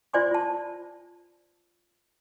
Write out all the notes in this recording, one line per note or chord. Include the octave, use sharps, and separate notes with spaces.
F4 C5 D5 G#5 C6 D6
F4 A5